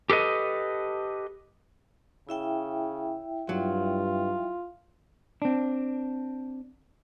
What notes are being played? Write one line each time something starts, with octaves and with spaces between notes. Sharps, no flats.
G4 A4 B4 D#5
C#3 E4 E5 G5
G2 F#3 F4
C4 D4